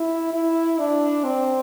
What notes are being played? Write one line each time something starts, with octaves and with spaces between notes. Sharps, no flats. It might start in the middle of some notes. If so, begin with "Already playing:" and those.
Already playing: E4
E4
D4
C4